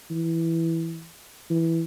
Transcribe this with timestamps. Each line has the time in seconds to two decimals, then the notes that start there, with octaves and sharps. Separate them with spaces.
0.11 E3
1.50 E3